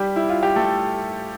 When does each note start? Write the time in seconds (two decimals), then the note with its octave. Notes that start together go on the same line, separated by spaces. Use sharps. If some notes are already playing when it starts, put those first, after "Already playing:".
Already playing: G3 G4
0.16 E4
0.29 F4
0.43 G4
0.56 A3 A4